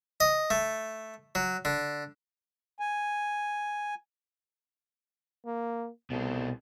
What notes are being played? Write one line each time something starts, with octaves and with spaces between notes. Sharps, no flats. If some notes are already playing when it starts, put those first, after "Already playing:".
D#5
A3
F#3
D3
G#5
A#3
C2 B2 A4